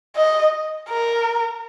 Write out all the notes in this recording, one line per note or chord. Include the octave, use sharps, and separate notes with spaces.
D#5
A#4